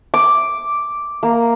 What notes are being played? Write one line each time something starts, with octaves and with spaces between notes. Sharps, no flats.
D6
A#3